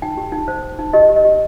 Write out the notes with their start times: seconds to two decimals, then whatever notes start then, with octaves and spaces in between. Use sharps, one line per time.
0.02 D#4 G5
0.17 G4
0.32 D#4
0.48 C5
0.63 C5
0.79 D#4
0.93 G4 D#5
1.09 G4
1.16 D#5
1.25 G4